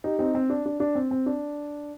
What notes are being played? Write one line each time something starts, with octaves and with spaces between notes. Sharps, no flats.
D#4 G4
C4 D#4
C4
D4
D4
D4
C4
C4
D4